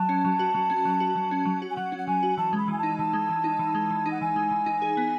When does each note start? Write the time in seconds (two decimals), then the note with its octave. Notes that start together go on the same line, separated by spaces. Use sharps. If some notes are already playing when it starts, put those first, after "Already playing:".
Already playing: F#3 A5
0.09 C#4
0.25 F#3
0.39 F#4
0.54 F#3
0.70 C#4
0.85 F#3
1.00 F#4
1.16 F#3
1.31 C#4
1.45 F#3
1.62 F#4
1.70 G#5
1.76 F#3 F#5
1.92 C#4
1.98 F#5
2.07 F#3 G#5
2.23 F#4
2.38 E3 A5
2.53 G#3 B5
2.68 E3 G#5
2.78 D#4 A5
2.99 E3 A5
3.13 G#3
3.29 E3
3.44 D#4
3.59 E3
3.75 G#3
3.91 E3
4.06 D#4
4.11 F#5
4.21 E3 G#5
4.36 G#3
4.51 E3
4.66 D#4
4.82 G#4
4.97 B3